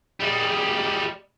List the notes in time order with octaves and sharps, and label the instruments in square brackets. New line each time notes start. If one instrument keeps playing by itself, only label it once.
[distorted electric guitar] G3 G#3